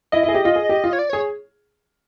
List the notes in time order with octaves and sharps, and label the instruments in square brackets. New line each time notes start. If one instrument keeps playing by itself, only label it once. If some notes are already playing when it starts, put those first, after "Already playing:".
[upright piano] E4 [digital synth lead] D#5
[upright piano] E4
G#4
G4
F4
G#4
G4
F4
[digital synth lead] C#5
D5
[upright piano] G#4 [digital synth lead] C#5